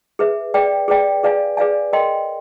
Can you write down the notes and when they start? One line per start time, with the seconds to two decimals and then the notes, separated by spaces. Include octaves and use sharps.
0.19 G#4 B4 E5
0.54 G#4 B4 D5 G5
0.88 G#4 B4 D5 G5
1.23 G#4 B4 D5 F5 G#5
1.57 G#4 B4 D5 F5 G#5
1.93 A#4 D#5 G5 C6